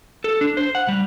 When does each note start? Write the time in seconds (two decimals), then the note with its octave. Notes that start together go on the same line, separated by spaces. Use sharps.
0.24 A4
0.41 D4
0.57 C5
0.75 F#5
0.88 G3